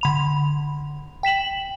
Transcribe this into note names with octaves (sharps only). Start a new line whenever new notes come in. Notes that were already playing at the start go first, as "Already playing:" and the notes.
D3 B5 F7
G5 B6 E7 F#7